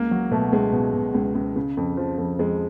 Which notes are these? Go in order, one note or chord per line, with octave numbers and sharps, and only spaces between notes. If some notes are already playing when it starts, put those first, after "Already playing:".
Already playing: C#2 A#3
F#3
B2 A3
C#2 G#3
B2
B2
C#2
C#2
C#3
F2
F3
F2
F2 G#3